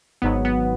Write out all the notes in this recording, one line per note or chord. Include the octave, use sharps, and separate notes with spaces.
G#1 G#2 F#3 B3
B3